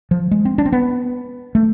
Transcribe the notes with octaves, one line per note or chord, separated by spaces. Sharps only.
F3
G#3
C4
D4
C4
B3
A3